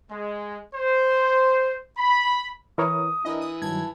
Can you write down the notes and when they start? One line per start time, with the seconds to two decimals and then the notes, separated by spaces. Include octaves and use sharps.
0.10 G#3
0.75 C5
1.98 B5
2.78 E3 E4 A#4 C#5 D#6
3.25 E3 D4 E4 A#4 D#5
3.41 D#6
3.62 G2 D#3 F#3 A5 G#6